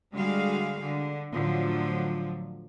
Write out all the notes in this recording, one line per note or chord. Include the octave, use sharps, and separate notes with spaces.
D3 G3 G#3 F#4 G#4 F5
D3
A2 D3 F3 F#3